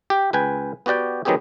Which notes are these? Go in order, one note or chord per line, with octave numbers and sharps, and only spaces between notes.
G4
C#2 B4 G5 G#5
B3 F#4 G4 D5 G5
D#3 F#3 B3 C4 G4 G#4